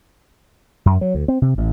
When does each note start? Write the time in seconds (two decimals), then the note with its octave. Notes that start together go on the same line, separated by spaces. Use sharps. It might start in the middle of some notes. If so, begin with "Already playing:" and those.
0.86 F#2
1.01 F#3
1.15 D2
1.28 C4
1.42 C3
1.58 A1